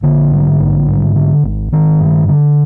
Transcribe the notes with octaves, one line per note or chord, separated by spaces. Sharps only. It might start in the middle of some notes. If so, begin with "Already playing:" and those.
A#1 D3
G#2
A#1
G#2
D3
G#1
G#1 D#3
G2
D3